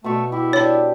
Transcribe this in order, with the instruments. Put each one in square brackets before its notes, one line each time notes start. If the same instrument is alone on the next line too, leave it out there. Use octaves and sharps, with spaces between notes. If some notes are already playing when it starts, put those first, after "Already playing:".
[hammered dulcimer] B2 C#6 [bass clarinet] A3
[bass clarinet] E4 [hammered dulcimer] G4
[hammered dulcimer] D4 G4 [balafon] C#5 B5